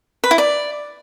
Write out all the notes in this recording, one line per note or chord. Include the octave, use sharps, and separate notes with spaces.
B4
E4
D5